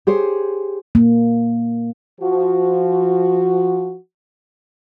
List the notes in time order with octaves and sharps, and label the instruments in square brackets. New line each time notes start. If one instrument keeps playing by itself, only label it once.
[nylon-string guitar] G4 G#4 C5 C#5
[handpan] A#3
[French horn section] F3 F#4